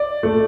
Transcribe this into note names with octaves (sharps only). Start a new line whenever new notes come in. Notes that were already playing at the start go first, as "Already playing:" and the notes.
Already playing: D5
A3